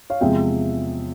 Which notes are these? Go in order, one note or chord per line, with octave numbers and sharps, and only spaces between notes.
C#5 F5
E2 C3 F3 G#3 E5 G5